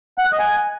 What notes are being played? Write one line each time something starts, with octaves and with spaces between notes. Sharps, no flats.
F#5
F#6
D#5
G#5